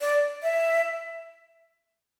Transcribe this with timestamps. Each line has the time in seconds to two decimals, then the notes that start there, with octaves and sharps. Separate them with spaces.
0.01 D5
0.43 E5